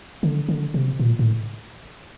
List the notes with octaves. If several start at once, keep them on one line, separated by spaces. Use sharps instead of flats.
D3
D3
C3
A#2
A2